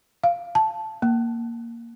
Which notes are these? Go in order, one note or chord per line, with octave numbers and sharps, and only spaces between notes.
F5
A5
A#3